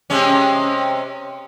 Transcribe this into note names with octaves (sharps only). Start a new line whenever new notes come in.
C3 G#3 C#4